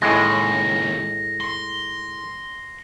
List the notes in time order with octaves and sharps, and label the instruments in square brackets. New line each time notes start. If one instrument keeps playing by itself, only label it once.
[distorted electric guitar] D#2 C#3 [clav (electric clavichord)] A2 G#3 [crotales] A#6
[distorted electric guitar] C6